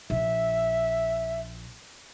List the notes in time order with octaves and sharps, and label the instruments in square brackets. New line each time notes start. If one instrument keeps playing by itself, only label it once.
[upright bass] A#1 [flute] E5